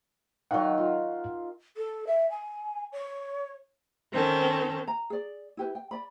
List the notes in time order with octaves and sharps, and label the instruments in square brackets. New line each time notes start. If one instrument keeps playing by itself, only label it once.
[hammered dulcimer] D#3 F#3 [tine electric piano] F5 F#5
[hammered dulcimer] F4
[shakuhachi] A4
E5
G#5
C#5
[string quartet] D#3 C4 C#4 A4
[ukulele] A#5
G#4 D5
E4 G4 B4
G5
D5 B5